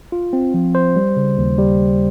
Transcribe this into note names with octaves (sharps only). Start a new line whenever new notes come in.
F4
C4
F3
C5
G3
C#3
D#2
G3